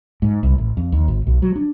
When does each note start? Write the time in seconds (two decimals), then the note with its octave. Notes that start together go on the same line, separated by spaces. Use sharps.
0.22 G#2
0.43 C2
0.58 A1
0.77 F2
0.92 D#2
1.08 G#1
1.27 B1
1.42 F#3
1.56 D4